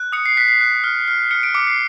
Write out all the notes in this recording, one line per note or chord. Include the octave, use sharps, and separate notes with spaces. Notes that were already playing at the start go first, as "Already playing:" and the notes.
Already playing: F#6
D#6 C#7
C7
F#6 B6
C7
F#6
F6
F6
F6 C#7
D7
D6 C#7
C7